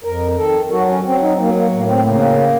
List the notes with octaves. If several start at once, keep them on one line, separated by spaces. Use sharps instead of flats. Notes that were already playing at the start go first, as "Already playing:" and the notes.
F2 A#4
D#3 A4
F#3 F#4
C#4
F#3 C4
D#4
F#3 A#3
A#3
A2 A#3
C4
C#3 A#3